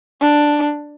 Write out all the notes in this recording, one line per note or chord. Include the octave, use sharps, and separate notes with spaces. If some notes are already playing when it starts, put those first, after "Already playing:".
D4